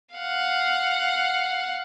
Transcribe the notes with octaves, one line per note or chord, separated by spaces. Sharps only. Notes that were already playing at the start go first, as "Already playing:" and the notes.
F5 F#5